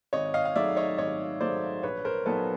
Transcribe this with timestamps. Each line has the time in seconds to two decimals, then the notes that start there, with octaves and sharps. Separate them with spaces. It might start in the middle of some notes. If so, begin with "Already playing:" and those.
0.13 G#1 C#5 D#5
0.34 D#5 F5
0.45 F5
0.55 G#2 D#3 F#3 A3 D5 E5
0.77 C#5 D#5
0.98 G#1 C#5 D#5
1.41 G#2 D#3 F#3 A3 C5 D5
1.83 A#1 B4 C#5
2.05 A#4 C5
2.26 A#2 F#3 B3 D#4 A4 B4